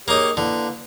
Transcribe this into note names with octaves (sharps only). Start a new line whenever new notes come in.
A#3 D#4 G4 G#4 C#5
D3 A#3 E4 B4